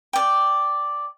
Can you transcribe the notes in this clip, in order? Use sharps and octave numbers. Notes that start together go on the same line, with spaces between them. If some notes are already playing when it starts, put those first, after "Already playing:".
D5 G5